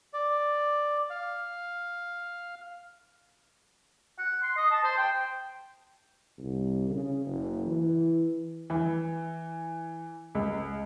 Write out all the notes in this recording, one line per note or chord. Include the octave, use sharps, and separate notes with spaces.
D5
F5
F#5
C6
D#5
A5
C5
G5
C2
C#3
F#1
E3
E3
C#2